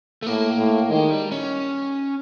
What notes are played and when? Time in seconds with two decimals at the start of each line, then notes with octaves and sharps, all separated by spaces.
0.23 A3
0.27 A2 A#3
0.58 A2
0.89 D#3 G#3
1.10 G3
1.32 C#4